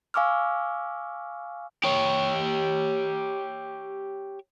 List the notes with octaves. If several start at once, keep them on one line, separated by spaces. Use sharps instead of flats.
F5 G#5 C#6 D6 E6 F6
G4 C#5